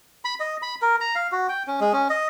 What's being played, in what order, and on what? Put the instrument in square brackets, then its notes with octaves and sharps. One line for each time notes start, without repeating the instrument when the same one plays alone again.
[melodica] B5
D#5
B5
A#4
A#5
F5
F#4
G5
C#4
G#3
C#4
D#5